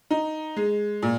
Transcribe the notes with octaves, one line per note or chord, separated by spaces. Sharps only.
D#4
G#3
A#2